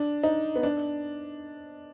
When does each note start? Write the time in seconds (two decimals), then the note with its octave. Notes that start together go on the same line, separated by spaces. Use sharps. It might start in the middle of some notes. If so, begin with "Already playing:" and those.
Already playing: D4
0.23 D#4
0.56 B3
0.63 D4